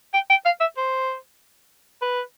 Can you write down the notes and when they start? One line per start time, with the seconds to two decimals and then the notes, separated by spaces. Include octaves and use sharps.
0.13 G5
0.30 G5
0.45 F5
0.60 E5
0.77 C5
2.02 B4